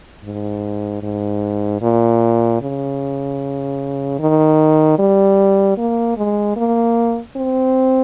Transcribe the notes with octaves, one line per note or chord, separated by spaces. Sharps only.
G#2
G#2
A#2
C#3
D#3
G3
A#3
G#3
A#3
C4